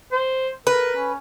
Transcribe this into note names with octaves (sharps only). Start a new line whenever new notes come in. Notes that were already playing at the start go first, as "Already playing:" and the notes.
C5
A#4 B4
C#4